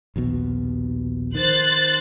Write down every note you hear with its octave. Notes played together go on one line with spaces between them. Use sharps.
A#1 D#2 B2
D#3 C5 F#6 A6